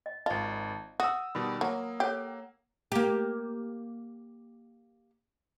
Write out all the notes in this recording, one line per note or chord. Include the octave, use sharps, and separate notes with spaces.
D#5
G#1 F4 D#5 A5
F#4 D#6 E6
B2 D#3 G3 B5
F#3 A#3
G4 A4 C#5 F#5
A#3 G4